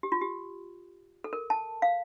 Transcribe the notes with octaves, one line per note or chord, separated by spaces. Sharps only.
G4
F4
G4
A4
A#4
A5
F5